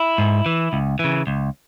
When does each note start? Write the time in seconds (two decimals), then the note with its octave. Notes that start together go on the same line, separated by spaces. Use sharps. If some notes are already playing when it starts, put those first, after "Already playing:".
Already playing: E4
0.18 G#2
0.46 E3
0.73 C#2
0.99 C#3 E3
1.27 C#2